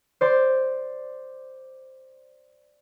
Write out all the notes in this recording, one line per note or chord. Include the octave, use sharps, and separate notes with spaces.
C5 D5 C6